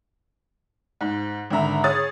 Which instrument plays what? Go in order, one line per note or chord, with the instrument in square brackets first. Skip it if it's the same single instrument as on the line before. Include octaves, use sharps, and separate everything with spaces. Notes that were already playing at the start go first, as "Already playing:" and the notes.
[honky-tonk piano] G#2
G#1 D3 E5 A#5
G#4 C#5 D#6 A6